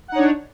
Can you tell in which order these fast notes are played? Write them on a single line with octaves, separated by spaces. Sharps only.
F#5 D#4 C#5 D4